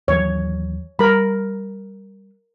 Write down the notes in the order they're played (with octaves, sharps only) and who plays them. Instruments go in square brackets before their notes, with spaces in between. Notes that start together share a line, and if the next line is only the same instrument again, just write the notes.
[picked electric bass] D#2 E3 F#3 [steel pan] C#5
[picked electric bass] G3 [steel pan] A#4 B5